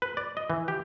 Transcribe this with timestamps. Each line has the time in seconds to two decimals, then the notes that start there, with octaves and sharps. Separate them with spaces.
0.02 B4
0.17 D5
0.37 D#5
0.50 E3
0.68 G4